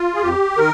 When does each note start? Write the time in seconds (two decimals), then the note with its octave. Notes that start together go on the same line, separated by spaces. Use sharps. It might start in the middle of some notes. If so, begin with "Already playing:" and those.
Already playing: F4
0.14 G#4
0.21 F2 G4
0.57 D#3 A#4